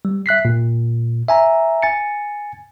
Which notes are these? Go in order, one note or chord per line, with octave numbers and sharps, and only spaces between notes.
G3
E5 F#6 B6 C7
A#2
E5 G#5 A#5
G#5 A6 C#7